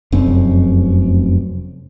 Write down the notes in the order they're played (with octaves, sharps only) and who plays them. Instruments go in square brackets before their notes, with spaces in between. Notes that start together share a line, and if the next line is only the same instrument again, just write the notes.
[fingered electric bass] F1 F#2 C4